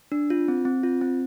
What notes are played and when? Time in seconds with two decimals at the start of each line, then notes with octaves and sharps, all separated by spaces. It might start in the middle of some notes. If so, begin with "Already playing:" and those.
0.12 D4
0.30 F4
0.48 C4
0.65 C4
0.83 F4
1.01 C4